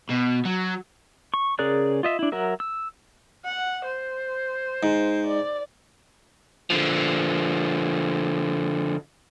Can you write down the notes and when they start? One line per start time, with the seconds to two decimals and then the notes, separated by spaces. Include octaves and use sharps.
0.10 B2
0.45 F#3
1.34 C#6
1.59 C#3 G#4 A#4 D5 F#6
2.03 F4 D#5 E5
2.19 D4 E4
2.32 F#3 F#4 A#4 E5
2.60 E6
3.45 F#5
3.85 C5
4.83 G#2
5.27 D5
6.70 D3 F3